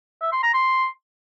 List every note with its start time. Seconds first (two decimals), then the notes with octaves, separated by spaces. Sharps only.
0.22 E5
0.32 C6
0.43 A#5
0.54 C6